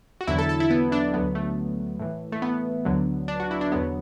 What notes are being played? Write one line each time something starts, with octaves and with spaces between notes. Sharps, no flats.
F#4
E2 D3 F#3 E4
A4
A4
E4
B3
D4
D2 D3 F#3 B3
A3
A2 E3
A3
B3
D2 D3 F#3
D4
F#4
E4
D4
E2 D3 F#3 B3